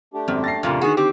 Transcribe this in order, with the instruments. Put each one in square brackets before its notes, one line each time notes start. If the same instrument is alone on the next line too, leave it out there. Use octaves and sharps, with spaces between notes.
[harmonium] A3 D4 G4
[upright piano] G#1 C4 [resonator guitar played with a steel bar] F#2
[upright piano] A6 A#6 C7
[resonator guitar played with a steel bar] F2 A#2 C#3
[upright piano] D3 D#3 [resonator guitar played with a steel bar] B3 F#4 [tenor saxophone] G#4
[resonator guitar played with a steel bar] C4 [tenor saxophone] G4